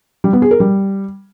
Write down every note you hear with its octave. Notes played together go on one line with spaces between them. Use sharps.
G3
B3
G#4
A#4
G3